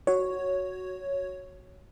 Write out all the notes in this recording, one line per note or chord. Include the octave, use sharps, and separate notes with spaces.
F#4 C#5